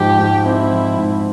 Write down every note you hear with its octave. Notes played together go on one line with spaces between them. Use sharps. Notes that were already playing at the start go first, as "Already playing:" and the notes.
Already playing: G#2 F3 G4
G#2
C4 E4
F3
G#2